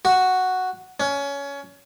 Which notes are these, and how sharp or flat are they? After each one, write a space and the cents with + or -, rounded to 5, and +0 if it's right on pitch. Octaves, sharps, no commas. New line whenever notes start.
F#4 +0
C#4 +20